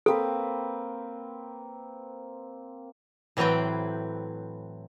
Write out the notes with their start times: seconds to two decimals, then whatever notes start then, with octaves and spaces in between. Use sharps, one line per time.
0.06 A#3 C4 A4 B4
3.37 A2 E3 F#3 C4 B4 G5